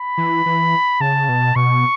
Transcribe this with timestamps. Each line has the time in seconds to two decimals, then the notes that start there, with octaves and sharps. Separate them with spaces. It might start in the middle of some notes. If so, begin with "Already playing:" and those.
Already playing: B5
0.18 E3
0.46 E3
1.00 C#3 A5
1.29 B2
1.56 B2 C#6